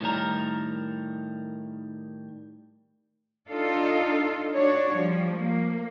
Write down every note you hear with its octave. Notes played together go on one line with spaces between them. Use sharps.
A2 D#3 G3 A#4
D4 D#4 F4 A4
D4 F#4 C#5
F3 G3
A#3